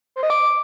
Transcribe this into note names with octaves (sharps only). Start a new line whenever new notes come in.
C5
D#5
D6